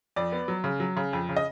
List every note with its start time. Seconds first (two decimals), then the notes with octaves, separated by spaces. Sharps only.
0.16 F2 D5
0.32 B3
0.48 F#3
0.64 C#3
0.80 F#3
0.97 C#3
1.13 F2
1.29 C#3
1.36 D#5